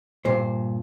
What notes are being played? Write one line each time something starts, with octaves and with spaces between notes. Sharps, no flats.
G2 A#2 C5